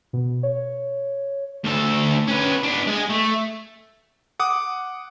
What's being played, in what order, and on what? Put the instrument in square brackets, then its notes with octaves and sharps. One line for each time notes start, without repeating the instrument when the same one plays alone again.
[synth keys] B2
C#5
[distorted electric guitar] D2 A4
C#4 B4
B3 D4
G#3 G#4
A3
[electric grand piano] F#5 D6 D#6